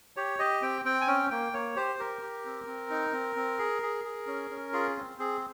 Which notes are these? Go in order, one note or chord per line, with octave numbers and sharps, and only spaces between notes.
G4 C#5
G4 D#5
C4 G5
C4 G5
G#5
C#4 G5
A#3 G5
A#3 C#5
G4 C5
G4 A#4
G4
C4
C4
D#4
C4
C4
G#4
G#4
G#4
C#4
C#4
F4 G#4
C4
C4 G#4